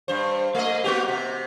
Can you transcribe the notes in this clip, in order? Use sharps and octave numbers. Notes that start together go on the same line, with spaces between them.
G2 C5
A3 D#5
A#3 F#4 G4
C3